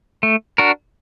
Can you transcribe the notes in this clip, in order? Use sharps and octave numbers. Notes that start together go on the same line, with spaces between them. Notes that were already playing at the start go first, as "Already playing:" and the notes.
A3
D4 F#4 A#4